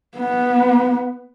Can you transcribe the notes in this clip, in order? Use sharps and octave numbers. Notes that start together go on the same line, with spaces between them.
B3